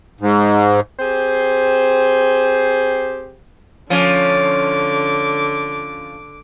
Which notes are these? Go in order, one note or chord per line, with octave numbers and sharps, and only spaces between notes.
G#2
C4 G4 G#4 C5
D3 F3 C#4 D6